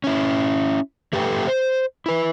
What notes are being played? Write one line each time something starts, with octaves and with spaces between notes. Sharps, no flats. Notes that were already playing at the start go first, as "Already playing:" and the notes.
C#4 E4
A3 G4 A4 B4 G5
C5
E4 B4